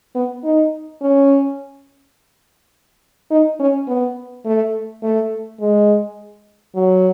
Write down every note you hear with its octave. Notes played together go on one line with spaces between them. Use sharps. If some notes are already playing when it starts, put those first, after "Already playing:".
B3
D#4
C#4
D#4
C#4
B3
A3
A3
G#3
F#3